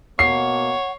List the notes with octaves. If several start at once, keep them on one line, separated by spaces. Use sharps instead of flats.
B2 A#3 C#5 F#5 C7